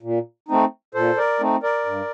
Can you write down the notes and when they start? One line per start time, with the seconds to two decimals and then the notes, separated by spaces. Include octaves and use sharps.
0.03 A#2
0.49 A3 C4 D#4
0.95 A#2 A4 C5
1.17 A#4 D5
1.40 A3 C4 D#4
1.63 A#4 D5
1.86 G2